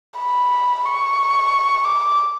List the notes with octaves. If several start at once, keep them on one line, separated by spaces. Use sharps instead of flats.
B5
C#6
D6